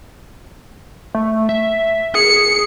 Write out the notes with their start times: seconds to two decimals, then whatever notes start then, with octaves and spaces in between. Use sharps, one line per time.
1.15 A3
1.49 E5
2.15 G#4 C#7